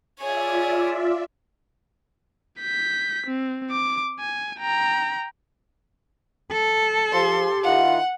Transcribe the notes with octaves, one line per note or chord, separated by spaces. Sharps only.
F4 G#4 C#5 D5 E5
G6 B6
C4
D6
G#5
G5 A#5
A4
F3 G4 C6
D#3 E4 F4 F#5